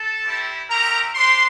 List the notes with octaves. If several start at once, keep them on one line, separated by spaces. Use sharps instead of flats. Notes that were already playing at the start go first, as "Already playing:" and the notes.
Already playing: A4 A5
G3 C4 E4 G4
A3 C4 G4 A#4 A#5
D4 G4 C5 C6